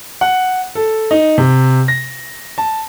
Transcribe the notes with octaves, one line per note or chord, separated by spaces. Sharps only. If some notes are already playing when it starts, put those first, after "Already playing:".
F#5
A4
D#4
C3
A#6
A5